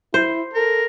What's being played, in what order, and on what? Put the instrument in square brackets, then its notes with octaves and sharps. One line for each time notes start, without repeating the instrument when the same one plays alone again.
[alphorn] E4 [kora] C5
[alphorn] A4 [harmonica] A#4